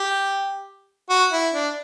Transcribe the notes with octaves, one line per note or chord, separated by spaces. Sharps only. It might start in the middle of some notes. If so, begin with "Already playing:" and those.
Already playing: G4
F#4
E4
D4